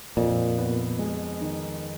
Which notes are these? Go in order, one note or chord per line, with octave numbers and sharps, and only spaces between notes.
F2 A#2
B3
G#3
D#3